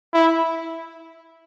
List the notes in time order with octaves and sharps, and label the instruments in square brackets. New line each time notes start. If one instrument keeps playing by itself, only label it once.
[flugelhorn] E4